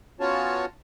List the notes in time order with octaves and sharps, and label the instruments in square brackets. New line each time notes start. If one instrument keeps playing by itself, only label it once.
[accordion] B3 C#4 F4 F#4 C#5 A5